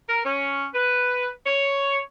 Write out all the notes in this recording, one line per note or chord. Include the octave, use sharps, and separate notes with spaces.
A#4
C#4
B4
C#5